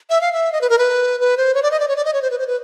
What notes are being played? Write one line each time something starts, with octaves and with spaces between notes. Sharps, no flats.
E5
F5
E5
D#5
B4
A#4
B4
B4
C5
C#5
D5
D#5
D5
C#5
D5
D#5
C#5
C5
B4
C5
B4